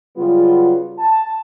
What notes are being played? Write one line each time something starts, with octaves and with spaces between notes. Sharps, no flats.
C#3 F#3 G3 B3 F4
A5